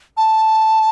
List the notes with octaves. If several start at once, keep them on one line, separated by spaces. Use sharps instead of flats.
A5